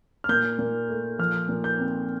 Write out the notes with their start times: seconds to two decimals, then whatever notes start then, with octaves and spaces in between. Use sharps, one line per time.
0.24 F6
0.29 A#2 G6
0.59 A#2
0.89 A3
1.19 F3 F6
1.49 A#2
1.64 G6
1.79 C4